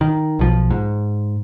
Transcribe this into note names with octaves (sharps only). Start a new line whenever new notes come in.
D#3
B1 F3
G#2